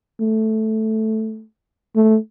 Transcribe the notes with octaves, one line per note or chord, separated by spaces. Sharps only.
A3
A3